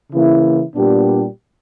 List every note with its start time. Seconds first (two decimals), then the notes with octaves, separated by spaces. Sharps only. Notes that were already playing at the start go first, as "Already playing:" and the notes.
0.11 C#3 E3 A#3 E4
0.75 A#2 G3 B3 D4 G4